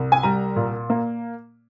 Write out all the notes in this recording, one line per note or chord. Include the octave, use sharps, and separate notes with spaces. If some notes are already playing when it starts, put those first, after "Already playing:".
Already playing: C2
G#5
G3 A#5
A#2
A#3